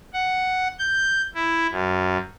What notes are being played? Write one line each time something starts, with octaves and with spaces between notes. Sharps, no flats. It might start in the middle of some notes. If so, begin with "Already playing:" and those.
F#5
G6
E4
F#2